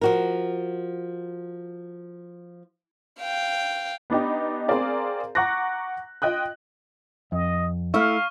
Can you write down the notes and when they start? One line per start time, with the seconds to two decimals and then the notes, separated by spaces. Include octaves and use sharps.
0.01 F3 F#4 A#4
3.21 F5 G5
4.10 B3 D4 D#4 G4
4.68 C4 G#4 A#4 D5 F5
5.35 F#5 A#5 C#6 D6 F#6 A#6
6.22 F4 D#5 G5 D#6 F#6
7.32 F2 D#5
7.94 A3 E4 E5 F5 C#6 F6